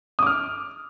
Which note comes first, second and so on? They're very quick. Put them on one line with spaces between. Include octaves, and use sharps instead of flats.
D#6 D6 F6